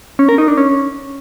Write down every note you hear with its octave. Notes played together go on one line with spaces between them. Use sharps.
C#4
A#4
D#4
D4
C#4